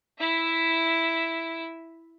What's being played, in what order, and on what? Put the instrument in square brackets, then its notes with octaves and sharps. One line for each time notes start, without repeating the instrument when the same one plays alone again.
[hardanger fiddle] E4 E5